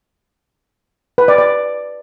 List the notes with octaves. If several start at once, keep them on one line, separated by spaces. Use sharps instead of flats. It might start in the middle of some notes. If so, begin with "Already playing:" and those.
B4
D5
D5